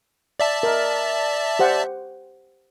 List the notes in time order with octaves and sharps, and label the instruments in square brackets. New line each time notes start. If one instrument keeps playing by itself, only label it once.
[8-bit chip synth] D5 E5 A5
[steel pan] A#4 D#5
G4 C5 F#5